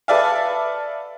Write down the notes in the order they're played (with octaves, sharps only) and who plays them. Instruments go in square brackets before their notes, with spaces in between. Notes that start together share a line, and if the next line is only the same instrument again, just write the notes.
[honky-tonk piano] A4 B4 D5 E5 F5